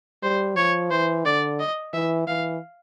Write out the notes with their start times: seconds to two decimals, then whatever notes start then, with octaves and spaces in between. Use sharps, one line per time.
0.23 G3 C5
0.57 F3 C#5
0.91 E3 C5
1.25 D3 D5
1.60 D#5
1.94 E3 E5
2.27 E3 F5